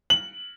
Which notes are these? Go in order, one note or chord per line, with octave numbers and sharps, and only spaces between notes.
F#7